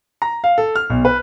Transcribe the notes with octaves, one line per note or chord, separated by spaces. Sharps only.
A#5
F5
A4
F6
B1
B4